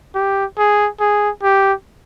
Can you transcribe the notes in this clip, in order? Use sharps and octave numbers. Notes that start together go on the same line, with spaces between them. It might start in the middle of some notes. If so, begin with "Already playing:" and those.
G4
G#4
G#4
G4